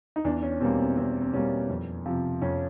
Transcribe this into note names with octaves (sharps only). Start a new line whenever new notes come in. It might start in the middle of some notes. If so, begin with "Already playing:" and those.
D#4
E2 D4
C#4
B2 G3 A#3 C4
C4
E2 C4
C4
B2 G3 A#3 C#4
F2
C3 F3
F2 C#4